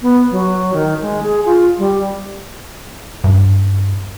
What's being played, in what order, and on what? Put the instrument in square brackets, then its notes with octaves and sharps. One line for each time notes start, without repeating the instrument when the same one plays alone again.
[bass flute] B3
F#3
D#3
G#3
G#4
F4
G3
[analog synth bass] G2